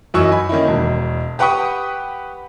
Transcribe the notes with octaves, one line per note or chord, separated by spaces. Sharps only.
F#2 E3 F#3 D#4 C#6 E6
G#5 B5
D#3 A#3 C#4 E4
E1
G4 B4 F#5 G5 C#6 D#6